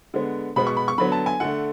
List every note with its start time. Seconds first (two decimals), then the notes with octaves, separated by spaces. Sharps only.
0.14 D3 G#3 B3
0.56 B2 G#3 B3 B5
0.67 C#6
0.77 B5
0.88 C#6
0.98 D3 F#3 B3 B5
1.12 A5
1.26 G#5
1.40 D3 A3 F#5